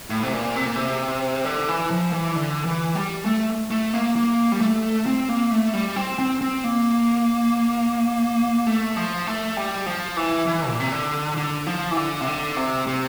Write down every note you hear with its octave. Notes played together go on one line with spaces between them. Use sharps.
A2
C3
A#2
C3
A#2
C3
D3
E3
F3
E3
D3
E3
G3
A3
A3
A#3
A#3
G3
A3
C4
A#3
A3
G3
C4
C4
C4
A#3
A3
F3
A3
G3
F3
E3
E3
A#2
C3
D3
D3
F3
E3
D3
C3
D3
C3
C3